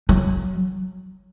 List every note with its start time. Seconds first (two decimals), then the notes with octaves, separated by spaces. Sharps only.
0.09 F#3